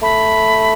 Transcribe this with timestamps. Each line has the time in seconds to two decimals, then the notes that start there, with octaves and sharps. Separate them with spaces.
0.02 A3 B5